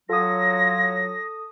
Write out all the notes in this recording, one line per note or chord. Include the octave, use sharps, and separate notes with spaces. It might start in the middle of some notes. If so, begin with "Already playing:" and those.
F#3 F4 A4 D#6 A#6